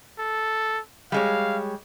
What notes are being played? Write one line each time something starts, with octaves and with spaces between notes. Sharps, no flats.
A4
G3 G#3 C#5 F5